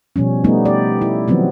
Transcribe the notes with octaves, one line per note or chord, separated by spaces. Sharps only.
B2 F3 G3 C#4
G3 A3 B3 D#4
G4 D5
E4
D#3 F3 F#3 B3 C4